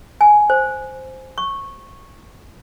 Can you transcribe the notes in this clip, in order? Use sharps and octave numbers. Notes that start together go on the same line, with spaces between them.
G#5
C5
C#6